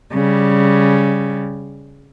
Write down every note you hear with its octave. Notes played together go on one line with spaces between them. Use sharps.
C#3 G3